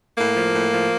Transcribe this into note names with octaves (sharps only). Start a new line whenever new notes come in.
A2 A#3
F3
A2
F3